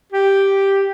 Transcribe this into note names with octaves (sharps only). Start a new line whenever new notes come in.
G4